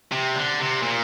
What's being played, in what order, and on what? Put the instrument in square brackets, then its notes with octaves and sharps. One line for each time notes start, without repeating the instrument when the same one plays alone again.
[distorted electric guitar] C3
D3
C3
A#2